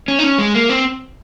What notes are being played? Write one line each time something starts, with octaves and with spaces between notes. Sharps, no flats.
C#4
D#4
C#4
G#3
A#3
C4